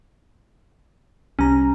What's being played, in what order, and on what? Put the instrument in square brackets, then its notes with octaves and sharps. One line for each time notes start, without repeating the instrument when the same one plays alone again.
[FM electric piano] C2 G3 A#5 [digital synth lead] C#4